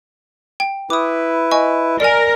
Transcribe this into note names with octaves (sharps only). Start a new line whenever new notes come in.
G5
E4 B4 D6 D#6
D#5 G#5 C#6
A#4 D5 G#5